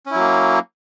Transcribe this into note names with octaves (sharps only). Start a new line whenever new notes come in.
F#3 A#3 C#4 E4